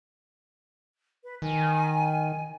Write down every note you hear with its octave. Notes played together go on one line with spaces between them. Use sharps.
B4
D#3 G#5